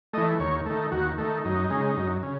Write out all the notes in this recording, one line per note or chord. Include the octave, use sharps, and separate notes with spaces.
E3 A3 D#5
D#2 C#5
D#3 A3
D#2 F#4
D#3 A3
F#2 D#4
C#3 G#3
F#2
C#3